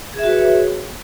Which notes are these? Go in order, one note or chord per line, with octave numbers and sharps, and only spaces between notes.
F#4 G#4 B4 C#5 E5